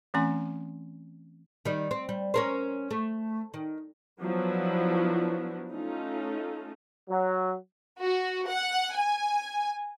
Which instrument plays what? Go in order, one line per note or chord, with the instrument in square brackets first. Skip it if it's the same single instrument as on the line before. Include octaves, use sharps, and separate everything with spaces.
[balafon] E3 A3 C4 C#4 G#5 C6
[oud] D#3 G3
C4
G3
C#4 A#4 C5
A3
D#3
[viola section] F3 F#3 B3 D4 E4 F#4
A3 C#4 D#4 F4 A4
[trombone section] F#3
[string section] F#4
F#5
G#5